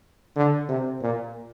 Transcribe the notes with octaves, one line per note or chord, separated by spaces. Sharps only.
D3
C3
A#2